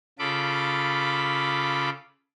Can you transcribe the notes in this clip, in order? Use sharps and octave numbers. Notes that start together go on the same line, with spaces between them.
C#3 F4 A4 B5 D6